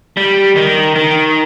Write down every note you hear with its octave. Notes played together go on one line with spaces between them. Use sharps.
G3
D#3
D#3